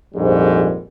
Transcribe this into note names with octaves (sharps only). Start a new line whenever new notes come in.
A#1 F2 G#2 G3